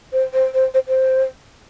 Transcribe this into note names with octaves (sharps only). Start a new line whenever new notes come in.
C5
C5
C5
C5
C5